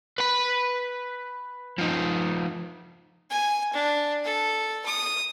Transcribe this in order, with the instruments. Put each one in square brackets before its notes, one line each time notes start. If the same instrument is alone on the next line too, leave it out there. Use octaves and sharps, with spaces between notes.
[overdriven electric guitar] B4 B5
F3 D#4
[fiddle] G#5
D4
A4
D#6